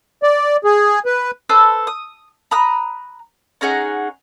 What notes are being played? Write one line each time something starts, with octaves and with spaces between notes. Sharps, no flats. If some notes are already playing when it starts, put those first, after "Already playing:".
D5
G#4
B4
A4 B4 C5 E6
D#6
A#5 B5 D#6 F#6
C#4 D#4 G#4 F#5